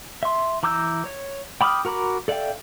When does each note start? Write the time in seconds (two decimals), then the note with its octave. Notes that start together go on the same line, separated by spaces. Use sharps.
0.23 E5 C6
0.63 E3 A#5 D6 E6 G6
1.05 C#5
1.61 G5 B5 D6 D#6 F6
1.85 F#4 A#4 A#5 B5 D6
2.28 A4 D5 E5 F5 G5